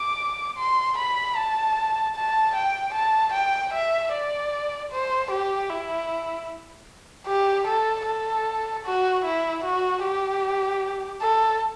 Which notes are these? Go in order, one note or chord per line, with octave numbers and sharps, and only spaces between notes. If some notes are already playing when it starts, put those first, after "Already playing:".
Already playing: D6
C6
B5
A5
A5
G5
A5
G5
E5
D5
C5
G4
E4
G4
A4
A4
F#4
E4
F#4
G4
A4